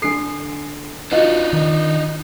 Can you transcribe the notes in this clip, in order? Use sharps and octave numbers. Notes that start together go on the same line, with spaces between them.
D3 A4 G#5 C7
D4 D#4 F4 F#4 B4 D#5
D#3